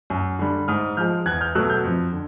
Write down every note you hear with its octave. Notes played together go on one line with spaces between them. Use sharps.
F#2
D3 G3
G#2 D#6 F6
F3 G#3 F6 G6
E2 F#6 G#6
F6 G6
B2 F#3 A3 E6 F#6
F6 G6
F2
D3